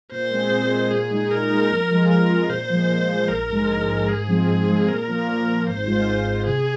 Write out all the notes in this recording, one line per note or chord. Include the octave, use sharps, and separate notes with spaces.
A#2 C5
G#3 C4 G#4
A#2
G#3 C4 G#4
A#2 G#4
G#3 D#4
A#2 A#4
G#3 D#4
F2
F3 G#3 F4
F2 A#4
F3 G#3 F4
A#2 C5
F3 G#3
A#2
F3 G#3
A#1 A#4
G#2 G#3
A#1
G#2 G#3
G#2 G#4
F3 G#3 C4
G#2
F3 G#3 C4
A#2 A#4
F3 A#3
A#2
F3 A#3
G#1 C5
G#2 G#3 F4
G#1
G#2 G#3 F4
C3 G#4